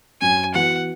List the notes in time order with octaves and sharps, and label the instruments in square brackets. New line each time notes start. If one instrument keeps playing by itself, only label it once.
[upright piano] F#2 [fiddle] G#5
[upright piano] E3 B3 F#4 [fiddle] F#5